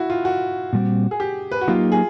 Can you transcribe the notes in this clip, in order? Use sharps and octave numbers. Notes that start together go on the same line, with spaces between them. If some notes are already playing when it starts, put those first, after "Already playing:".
Already playing: E4 F#4
F4
F#4
A#2 G3 C4
G#4
G4
B4
F#4
F#3 A#3 D#4 F4 G4
G#4